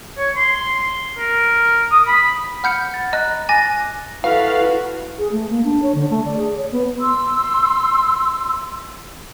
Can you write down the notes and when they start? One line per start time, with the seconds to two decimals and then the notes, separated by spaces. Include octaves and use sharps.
0.18 C#5
0.37 C6
1.18 A#4
1.91 D#6
2.07 B5
2.64 F#5 B5 F6 G6 C#7
2.94 A6
3.13 D#5 A#5 F#6
3.49 G#5 D6 A6 A#6
4.24 E4 F#4 A4 B4 F5
5.18 G#4
5.32 A3
5.50 A#3
5.64 D4
5.82 C#5
5.95 D3
6.10 A3
6.25 D5
6.37 G#4
6.57 C#5
6.72 B3
6.99 C6 E6